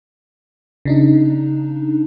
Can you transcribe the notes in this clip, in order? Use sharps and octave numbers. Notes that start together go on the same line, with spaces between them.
C#3 D4 D#4